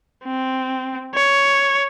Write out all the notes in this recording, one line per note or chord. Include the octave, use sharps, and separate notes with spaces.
C4
C#5